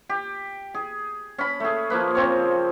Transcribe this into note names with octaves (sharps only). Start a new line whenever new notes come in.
G4
G#4
C#4 B5
A3 G#4
F3 A#3 B4
C#3 C4 C#5